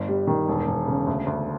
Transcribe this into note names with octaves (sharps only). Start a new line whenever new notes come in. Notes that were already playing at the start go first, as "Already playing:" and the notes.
Already playing: G1
G3
D#3
E1
E1
C#3
D2
D2